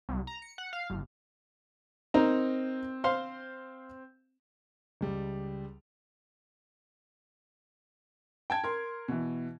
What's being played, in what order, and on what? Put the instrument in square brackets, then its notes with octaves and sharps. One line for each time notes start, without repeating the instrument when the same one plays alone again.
[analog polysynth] C2
A#5
C#7
F#5
F5
G1
[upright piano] C4 [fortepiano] D#4 A#4 A#5
[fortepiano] C5 F5 C6
[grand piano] C#2 G3
[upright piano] G5 A5 G#6
A#4 C6
B2 E3